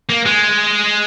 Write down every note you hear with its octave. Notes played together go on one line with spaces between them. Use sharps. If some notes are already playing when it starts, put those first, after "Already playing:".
A#3
G#3